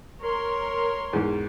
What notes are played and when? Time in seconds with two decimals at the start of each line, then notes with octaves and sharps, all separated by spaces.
0.22 A#4 C#5 C6
1.13 E2 G#2